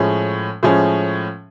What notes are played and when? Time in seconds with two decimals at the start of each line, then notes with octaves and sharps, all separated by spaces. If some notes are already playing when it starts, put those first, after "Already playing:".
Already playing: A2 F3 G#3 C#4
0.63 A2 F3 G#3 C#4